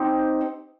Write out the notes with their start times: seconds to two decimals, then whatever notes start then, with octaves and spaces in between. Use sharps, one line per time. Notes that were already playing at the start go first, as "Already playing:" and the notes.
Already playing: C4 D#4 G4